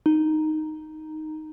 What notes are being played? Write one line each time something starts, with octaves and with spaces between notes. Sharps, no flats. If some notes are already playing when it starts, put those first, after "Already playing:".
D#4